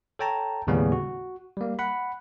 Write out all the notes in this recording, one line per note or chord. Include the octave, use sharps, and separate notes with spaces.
A4 C#5 G5 A5 A#5
D#2 A2 C#3 G3 B3 C#4
F#4
G3 A#3
F#5 B5